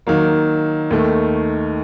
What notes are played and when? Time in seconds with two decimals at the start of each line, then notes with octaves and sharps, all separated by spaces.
0.07 D#3 F#3 A#3
0.91 D#2 D#3 A3